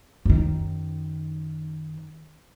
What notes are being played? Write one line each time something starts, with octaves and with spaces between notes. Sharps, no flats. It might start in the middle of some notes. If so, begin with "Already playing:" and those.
F#2 D#3